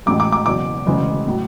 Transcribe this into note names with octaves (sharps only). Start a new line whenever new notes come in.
A1 A2 G#3 D6
D6
D6
F#1 E2 B2 F#3 D6
E1 D2 C#3 E3 G#3
A2 F#3